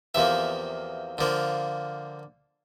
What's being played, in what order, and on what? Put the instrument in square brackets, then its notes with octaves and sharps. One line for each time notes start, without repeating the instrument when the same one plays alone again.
[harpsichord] E2 C3 F3 A#3 E5
D3 F3 A#3